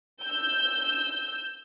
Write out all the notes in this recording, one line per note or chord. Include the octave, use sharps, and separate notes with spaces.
E6 G6